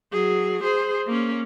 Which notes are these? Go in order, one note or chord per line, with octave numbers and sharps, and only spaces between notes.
F#3 G#4
G#4 C5
A#3 C#4